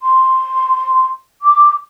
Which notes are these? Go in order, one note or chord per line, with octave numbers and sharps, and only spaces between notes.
C6
D6